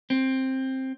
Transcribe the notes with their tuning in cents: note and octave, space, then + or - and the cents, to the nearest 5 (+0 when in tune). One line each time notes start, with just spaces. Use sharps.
C4 +10